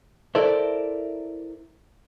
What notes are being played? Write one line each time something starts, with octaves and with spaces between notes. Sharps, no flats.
E4 A4 A#4 C5 D5 E5